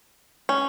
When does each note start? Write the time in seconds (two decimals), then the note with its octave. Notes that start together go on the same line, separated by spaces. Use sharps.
0.49 C#4